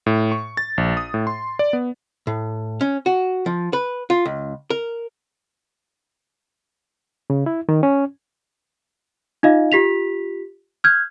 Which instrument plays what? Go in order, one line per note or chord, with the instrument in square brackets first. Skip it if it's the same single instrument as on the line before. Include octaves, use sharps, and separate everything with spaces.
[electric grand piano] A2
C#6
A6
A#1
D#6
A2
C6
D5
B3
[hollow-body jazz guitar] A2
C#4
F#4
F3
B4
F4
C#2
A#4
[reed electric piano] C#3
E4
D#3
C#4
[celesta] D#4 F4 D#5 F5
F4 G4 B6 F7
F6 G6 G#6